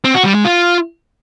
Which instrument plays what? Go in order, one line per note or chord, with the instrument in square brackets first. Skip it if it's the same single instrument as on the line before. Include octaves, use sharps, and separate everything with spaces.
[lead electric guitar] C4
F#4
G3
G#3
F4